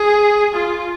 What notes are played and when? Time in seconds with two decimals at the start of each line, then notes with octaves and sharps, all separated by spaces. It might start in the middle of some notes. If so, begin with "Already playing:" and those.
Already playing: G#4
0.54 F4